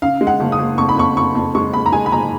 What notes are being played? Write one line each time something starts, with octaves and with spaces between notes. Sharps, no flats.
C#3 F5
G#3
F#5
F#1
D#6
F#1
F2 C#6
B5
F2 C#6
F#1 C#6
F2
G#3 C#6
F#1 B5
A#5
G#3 G#5
B5
F#1 A#5